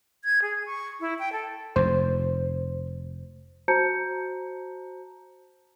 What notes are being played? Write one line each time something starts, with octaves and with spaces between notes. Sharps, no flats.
G#6
G#4
C#6
E4
G5
A4
F1 F2 C5
F#4 C5 A5 A#5 G6 C#7